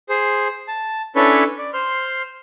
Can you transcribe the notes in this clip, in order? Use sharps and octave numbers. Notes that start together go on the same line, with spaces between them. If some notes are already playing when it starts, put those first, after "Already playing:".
G#4 C5
A5
C#4 D4 E4 A4 B4 C#5
D5
C5 C6 F6